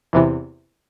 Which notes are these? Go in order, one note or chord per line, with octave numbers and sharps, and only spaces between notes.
E2 C3 E3